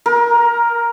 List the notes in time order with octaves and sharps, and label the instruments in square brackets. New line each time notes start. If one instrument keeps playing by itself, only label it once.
[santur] A#4